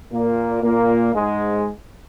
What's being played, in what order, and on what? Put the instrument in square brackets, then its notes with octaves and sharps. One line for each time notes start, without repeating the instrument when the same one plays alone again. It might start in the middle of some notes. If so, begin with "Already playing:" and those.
[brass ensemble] A#2 A#3
A#2 A#3
G#2 G#3